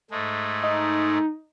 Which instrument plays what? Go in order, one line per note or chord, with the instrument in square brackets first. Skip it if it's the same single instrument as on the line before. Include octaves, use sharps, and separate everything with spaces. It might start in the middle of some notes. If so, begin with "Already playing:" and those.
[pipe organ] G#2 G#3 A3
[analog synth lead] D#4